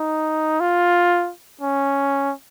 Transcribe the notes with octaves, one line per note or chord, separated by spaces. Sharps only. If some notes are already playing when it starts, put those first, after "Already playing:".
Already playing: D#4
F4
C#4